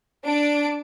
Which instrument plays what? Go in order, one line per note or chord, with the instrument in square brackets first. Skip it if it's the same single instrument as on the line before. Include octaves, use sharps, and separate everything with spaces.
[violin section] D4 D7